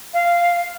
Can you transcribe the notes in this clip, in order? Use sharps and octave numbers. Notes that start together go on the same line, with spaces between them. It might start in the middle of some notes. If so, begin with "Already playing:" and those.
F5